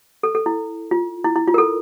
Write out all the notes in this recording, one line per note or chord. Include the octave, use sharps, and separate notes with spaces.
A4
A4
E4
F4
E4
E4
F4
A#4
A4